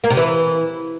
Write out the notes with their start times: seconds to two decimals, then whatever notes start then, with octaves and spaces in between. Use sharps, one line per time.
0.04 A#3
0.10 C3
0.17 E3